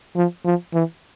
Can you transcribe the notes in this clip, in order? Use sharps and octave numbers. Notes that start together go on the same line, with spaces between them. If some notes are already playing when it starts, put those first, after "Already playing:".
F3
F3
E3